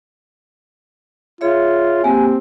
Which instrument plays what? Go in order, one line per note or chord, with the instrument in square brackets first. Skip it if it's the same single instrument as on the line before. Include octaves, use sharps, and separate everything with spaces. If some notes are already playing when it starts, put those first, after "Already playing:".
[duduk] F4 [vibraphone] G#4 C#5 E5
[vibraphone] A#3 G4 [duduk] C4 [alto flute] G#5